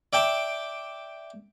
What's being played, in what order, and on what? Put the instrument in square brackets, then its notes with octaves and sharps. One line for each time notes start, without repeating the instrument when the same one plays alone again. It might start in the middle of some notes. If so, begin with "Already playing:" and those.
[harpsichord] D5 E5 G5 A5 D6